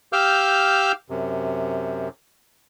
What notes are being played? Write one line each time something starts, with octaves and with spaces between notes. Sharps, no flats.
G4 F5 D6 E6 F6 G6
F#2 C3